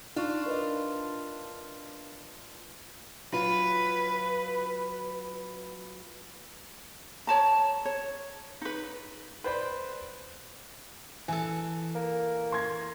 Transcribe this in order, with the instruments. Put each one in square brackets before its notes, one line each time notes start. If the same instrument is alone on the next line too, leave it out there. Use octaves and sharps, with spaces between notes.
[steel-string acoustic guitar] D4 F4 [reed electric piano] D#4 C#6
[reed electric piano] A#4 B4 D#5
[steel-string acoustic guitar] F#3 F4 [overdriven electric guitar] B4
[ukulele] C#5 A5 A#5
C#5
D#4 B4
[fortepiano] B4 C5 D5 B5
[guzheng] E3 A4 [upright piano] G#5
[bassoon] A#3
[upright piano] C6 G#6 A#6